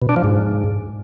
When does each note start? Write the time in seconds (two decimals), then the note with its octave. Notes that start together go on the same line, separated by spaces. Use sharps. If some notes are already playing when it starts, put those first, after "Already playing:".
0.02 B2
0.09 D4
0.16 F3
0.24 G#2